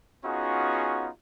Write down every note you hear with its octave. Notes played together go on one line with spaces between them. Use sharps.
B3 C#4 D#4 F4 F#4 G#4